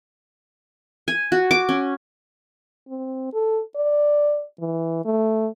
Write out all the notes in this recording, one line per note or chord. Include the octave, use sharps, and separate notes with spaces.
G#5
F#4
D6
C#4
C4
A4
D5
E3
A3